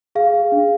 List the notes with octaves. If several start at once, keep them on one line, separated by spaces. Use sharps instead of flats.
G#4 F5
G#4
D4